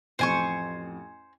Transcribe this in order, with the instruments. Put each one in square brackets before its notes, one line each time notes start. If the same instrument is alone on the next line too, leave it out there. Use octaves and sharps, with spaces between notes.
[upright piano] A1 F2 [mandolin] C5 G#5 C#6